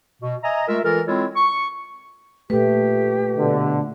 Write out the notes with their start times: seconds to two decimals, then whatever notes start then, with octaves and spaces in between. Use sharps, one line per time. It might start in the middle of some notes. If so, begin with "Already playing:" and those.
0.22 B2
0.43 D#5 E5 G#5 A#5
0.68 G#3 A3 F4 A#4 E5
0.84 E3 G#3 F4 A4 A#4
1.07 G#3 C4 E4 F4 A4 C#5
1.36 C#6
2.50 A#2 A3 G4 B4
3.37 B2 D3